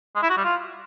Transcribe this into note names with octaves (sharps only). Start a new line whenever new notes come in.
G#3
E4
F#4
G3
F4